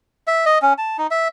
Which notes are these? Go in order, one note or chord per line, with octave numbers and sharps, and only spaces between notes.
E5
D#5
C#4
A5
D#4
E5